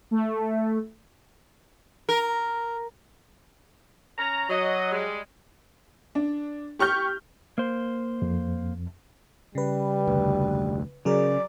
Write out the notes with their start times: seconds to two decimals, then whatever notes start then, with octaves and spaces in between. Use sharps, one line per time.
0.11 A3
2.09 A#4
4.18 C#4 A#5
4.50 F#3 D#5
4.91 G3 G#3
6.15 D4
6.79 G4 C#6 F6 G6
7.58 A#3 C5
8.22 F2
9.55 C#3 G3 B4
10.07 F1 D2
11.05 C#3 F#3 G#4 A#4 D5